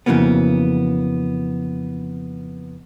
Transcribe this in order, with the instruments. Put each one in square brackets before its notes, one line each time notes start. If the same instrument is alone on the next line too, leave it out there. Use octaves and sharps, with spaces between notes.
[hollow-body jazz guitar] F2 C#3 E3 F#3 A#3 B3